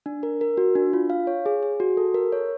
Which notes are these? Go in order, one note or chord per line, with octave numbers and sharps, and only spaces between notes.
D4
A#4
A#4
F#4
D4
F4
F5
C#5
G#4
G#4
F#4
A4
A#4
C#5